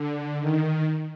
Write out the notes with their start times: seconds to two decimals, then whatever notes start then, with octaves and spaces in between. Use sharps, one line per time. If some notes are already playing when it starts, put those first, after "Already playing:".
Already playing: D3
0.40 D#3